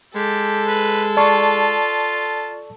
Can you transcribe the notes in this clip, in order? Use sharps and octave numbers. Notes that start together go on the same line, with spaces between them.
G#3 G4 A4
B4
F4 D5 A5 C#6